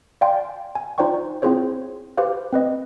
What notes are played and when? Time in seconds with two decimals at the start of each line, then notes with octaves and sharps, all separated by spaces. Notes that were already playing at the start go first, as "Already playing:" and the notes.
0.21 D5 F5 G5 G#5 C6
0.75 G#5
0.98 D#4 F4 C5 D5 G5 C#6
1.42 C4 E4 F4 G#4 C5 C#5
2.17 G4 B4 C5 F5
2.53 C4 B4 D#5